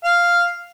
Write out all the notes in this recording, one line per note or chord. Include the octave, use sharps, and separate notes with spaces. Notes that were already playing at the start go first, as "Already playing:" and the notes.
F5